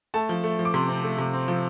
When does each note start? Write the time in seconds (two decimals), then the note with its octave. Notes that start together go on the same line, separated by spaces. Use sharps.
0.14 A3 A5
0.29 F3
0.44 A3
0.59 F3
0.65 D6
0.74 C3 C6
0.88 C4
1.04 A3
1.18 C3
1.33 C4
1.48 F3